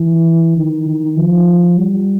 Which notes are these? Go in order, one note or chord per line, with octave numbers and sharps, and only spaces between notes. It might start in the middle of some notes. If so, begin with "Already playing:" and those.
Already playing: E3
D#3
D#3
F3
G3